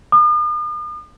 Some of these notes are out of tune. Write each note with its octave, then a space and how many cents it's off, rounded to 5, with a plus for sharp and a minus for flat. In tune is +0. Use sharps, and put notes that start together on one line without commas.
D#6 -45